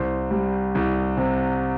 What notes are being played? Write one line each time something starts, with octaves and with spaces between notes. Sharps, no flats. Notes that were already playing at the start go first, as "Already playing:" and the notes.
Already playing: C2 C5 C6
G3
C2
C3